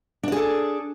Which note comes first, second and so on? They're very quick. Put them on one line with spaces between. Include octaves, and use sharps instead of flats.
D4 D5 G#4 A4